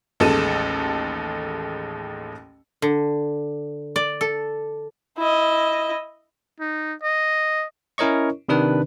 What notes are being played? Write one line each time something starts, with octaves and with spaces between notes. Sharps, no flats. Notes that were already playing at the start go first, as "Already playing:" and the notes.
A1 D#2 G#3 A4 D#7 E7
D3
D5
A4
E4 D#5
D#4
D#5
C#4 E4 A#4 C#5 D#5 C#6
C3 D#3 D4 B4